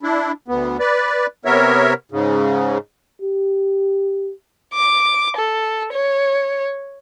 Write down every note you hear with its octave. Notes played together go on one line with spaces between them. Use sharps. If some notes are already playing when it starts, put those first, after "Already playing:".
D4 E4
D2 B3
B4 D5
C3 B3 A#4 C#5 E5
G#2 C#3
G4
D6
A4
C#5